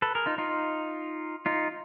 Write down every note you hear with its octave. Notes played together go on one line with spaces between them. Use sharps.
A4 B4
G#4 A#4
D#4 F4
D#4 F4
D#4 F4